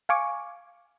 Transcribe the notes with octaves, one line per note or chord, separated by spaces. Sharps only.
F5 G#5 C#6 D6